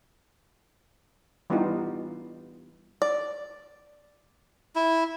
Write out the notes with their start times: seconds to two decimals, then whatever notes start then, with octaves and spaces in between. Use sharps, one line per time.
1.50 E3 G3 B3 D4 D#4 F4
3.02 D5
4.76 E4